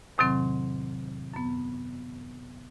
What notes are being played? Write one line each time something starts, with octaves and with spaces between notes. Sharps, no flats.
E2 A2 C3 D#3 F#3 C4
F#2 B3